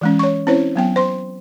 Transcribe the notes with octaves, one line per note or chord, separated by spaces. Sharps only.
E3 G#3 C#4
C#5 C#6
C4 C#4 E4 C5 C#5
F#3 B3 G5
C5 C6